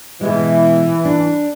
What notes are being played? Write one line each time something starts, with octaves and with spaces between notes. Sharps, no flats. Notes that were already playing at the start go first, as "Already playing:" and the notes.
B2 E3 G#3
D4